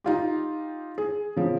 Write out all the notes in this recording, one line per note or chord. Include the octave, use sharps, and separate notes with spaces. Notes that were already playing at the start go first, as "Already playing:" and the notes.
D#4 F4 G4
G#4
C#3 F3